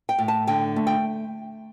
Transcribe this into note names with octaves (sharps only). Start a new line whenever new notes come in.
G5
A2
A5
D3 G5
A3
G5